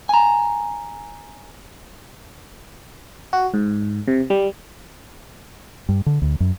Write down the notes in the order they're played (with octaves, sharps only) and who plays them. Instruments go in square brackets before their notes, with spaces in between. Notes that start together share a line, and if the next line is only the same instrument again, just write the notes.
[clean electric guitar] G#5 A#5
[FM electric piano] F#4
G#2
C3
G3
[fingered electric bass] G2
D3
D2
F#2